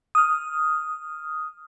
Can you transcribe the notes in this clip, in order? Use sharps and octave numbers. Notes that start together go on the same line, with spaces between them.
D#6 F6